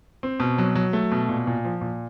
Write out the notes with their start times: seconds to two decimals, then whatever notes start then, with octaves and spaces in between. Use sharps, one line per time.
0.23 C4
0.40 B2
0.58 F#3
0.75 F#3
0.93 A3
1.12 B2
1.29 A#2
1.47 A#2
1.65 F3
1.81 A#2